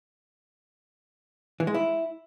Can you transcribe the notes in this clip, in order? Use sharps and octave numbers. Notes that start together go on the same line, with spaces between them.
E3
G#3
E4